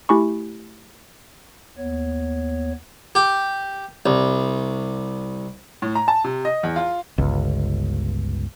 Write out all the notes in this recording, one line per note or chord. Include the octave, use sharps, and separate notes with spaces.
A3 E4 G4 G#5 B5 C#6
D#2 B3 C#5
G4
C2
A2
A#5
A5
C3
D#5
E2
F4
G1 C#2